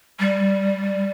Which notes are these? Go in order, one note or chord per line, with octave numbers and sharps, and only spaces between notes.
G3